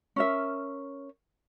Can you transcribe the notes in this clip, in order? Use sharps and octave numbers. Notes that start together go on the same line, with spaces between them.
C#4 A#4 E5